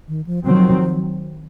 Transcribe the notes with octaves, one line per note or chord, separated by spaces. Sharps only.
D#3
F3
D#3 F3 F#3 C4